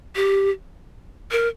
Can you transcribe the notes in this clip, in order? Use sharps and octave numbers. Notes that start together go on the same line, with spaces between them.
G4
A#4